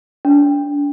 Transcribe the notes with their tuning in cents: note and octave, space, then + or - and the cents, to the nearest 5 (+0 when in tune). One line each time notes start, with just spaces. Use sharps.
D4 -35